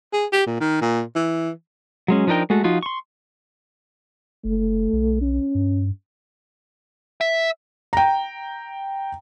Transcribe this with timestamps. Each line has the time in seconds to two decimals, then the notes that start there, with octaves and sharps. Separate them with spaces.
0.13 G#4
0.32 G4
0.47 A#2
0.60 D#3
0.81 A#2
1.15 E3
2.08 F#3 G#3 C#4
2.27 F3 D4 D#4 A#4 G5
2.50 G#3 A3 F#4 A4
2.64 F3 D#4 F4 F#4
2.83 C6 C#6
4.45 F#1 A3
4.93 B1
5.22 C#4
5.55 G2
7.21 E5
7.93 G5 A#5